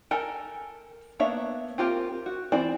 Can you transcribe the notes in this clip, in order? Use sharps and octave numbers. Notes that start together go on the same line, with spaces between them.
A4 A#4 G5 G#5
A#3 B3 D4 C#5 E5
C4 F4 G4 A#4
F#4
E3 C4 E4 D5